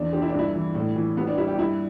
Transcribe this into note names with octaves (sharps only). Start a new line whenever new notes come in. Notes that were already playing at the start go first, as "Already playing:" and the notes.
Already playing: E2 D4
D3 G4
E4
D4
G2 E4
E3
A2
E3
G3 B3
D4
G3 E4
G4
G2 E4